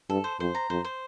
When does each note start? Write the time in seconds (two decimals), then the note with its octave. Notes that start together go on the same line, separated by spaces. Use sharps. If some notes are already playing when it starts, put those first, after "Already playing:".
0.10 G2 A4
0.24 C5
0.40 F2 C5
0.55 A#5
0.70 F2 C5
0.85 C5